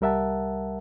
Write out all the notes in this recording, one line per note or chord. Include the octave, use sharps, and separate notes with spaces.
C2 G3 A#4 E5 F#5 A5